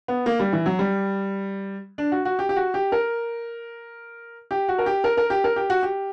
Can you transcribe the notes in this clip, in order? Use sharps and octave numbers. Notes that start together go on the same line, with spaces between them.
B3
A#3
G3
E3
F#3
G3
D4
F#4
F#4
G4
G4
F#4
G4
A#4
G4
F#4
A#4
G4
A#4
A#4
G4
A#4
G4
F#4
G4